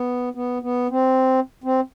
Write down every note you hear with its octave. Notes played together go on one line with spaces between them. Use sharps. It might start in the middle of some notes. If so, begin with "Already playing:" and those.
Already playing: B3
B3
B3
C4
C4